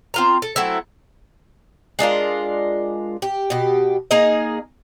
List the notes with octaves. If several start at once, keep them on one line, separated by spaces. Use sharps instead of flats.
C4 F4 A#5
A4
F#3 A3 C4 E4
G#3 D4 F4 A#4
G4
B2 G4
A#3 D#4 G#4 D#5